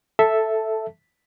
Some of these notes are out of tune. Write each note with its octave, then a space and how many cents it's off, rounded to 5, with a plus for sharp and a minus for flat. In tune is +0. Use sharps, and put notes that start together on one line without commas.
A4 +0 E5 +0 A5 +0